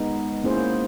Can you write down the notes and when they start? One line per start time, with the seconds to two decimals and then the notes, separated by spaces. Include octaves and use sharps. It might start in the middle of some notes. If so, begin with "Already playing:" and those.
Already playing: G#3 B3 D#4
0.44 A#3 C#4 E4 G#4 C5